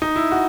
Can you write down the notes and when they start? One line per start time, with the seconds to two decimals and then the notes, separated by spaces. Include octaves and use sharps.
0.02 D#4
0.16 E4
0.32 F#4